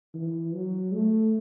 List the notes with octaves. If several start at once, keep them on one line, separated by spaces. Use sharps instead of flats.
E3
F#3
A3